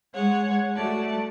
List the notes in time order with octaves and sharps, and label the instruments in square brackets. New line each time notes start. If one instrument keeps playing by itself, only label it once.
[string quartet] G#3 G#4 C#5 F#5
A3 F#4 D5 A5